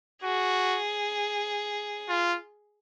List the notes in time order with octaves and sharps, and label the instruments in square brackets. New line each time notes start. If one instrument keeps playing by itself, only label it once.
[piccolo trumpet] F#4 [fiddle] G#4
[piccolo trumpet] F4